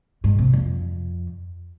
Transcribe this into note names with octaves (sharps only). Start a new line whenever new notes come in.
G#2
C3
F2